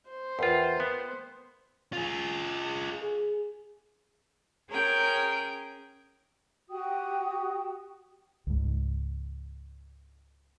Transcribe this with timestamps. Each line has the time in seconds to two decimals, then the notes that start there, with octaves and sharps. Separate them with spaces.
0.10 C5
0.39 E2 F4 A#4 B4 G5
0.80 B3
1.93 F4 G#4
3.02 G#4
4.68 C#4 G#4 A#4 G5
6.69 F#4 G4 G5 D#6
8.47 C#2 G#2